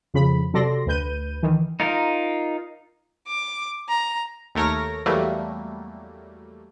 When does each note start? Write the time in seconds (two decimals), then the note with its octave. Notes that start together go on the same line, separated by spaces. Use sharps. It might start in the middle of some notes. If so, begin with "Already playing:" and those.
0.14 F2 C#3 F3 B5
0.53 C3 F#3 A4 D5 C6 A#6
0.86 D2 B4 G6 D#7
1.43 D#3 E3
1.80 D#4 F4 A#4
3.27 D6
3.89 A#5
4.55 D#2 A3 A#4 C#5 A#6
5.06 E2 F#3 G3 A3 A#3